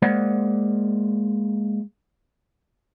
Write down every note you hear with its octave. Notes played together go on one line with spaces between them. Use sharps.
G#3 A#3 C5 D5 F#5